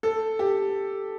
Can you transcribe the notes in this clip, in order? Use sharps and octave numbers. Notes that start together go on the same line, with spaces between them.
A4
G4